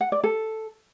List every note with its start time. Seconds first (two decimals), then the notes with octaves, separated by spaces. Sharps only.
0.01 F#5
0.12 D5
0.24 A4